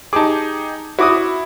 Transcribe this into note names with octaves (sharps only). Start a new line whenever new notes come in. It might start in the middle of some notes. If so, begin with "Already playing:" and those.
D#4 G4 G#4 A5 D6
E4 F#4 D6 D#6